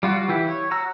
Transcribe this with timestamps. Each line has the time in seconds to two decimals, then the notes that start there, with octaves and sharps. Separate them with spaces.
0.03 G3 F4 F#4
0.28 E3 E4 G4
0.48 C#5
0.71 F#4 A#5 E6